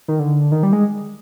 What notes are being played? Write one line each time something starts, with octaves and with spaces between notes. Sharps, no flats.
D#3
D3
D#3
G3
G#3